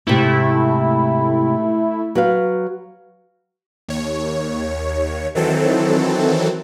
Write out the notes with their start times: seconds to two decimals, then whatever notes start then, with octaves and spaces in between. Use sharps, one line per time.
0.07 G#2 C3 A3 E4
2.15 F#3 B4 F5
3.88 D#2 C#5
5.35 D#3 E3 F#3 C4 A4